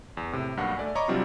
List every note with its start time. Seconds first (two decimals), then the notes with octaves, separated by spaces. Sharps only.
0.17 E2
0.32 A2 C3
0.57 B1 G2 A#3 F#5
0.77 A3 D5 G#5
0.95 C#5 D#5 A#5 B5 C#6 D6
1.08 C3 F#3 G3 C4 D4 F4